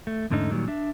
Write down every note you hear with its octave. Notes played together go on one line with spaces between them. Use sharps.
A3
E2 G#2 D3 A3 C#4 D#4
A#2 D#3 F#3 G3
D4 E5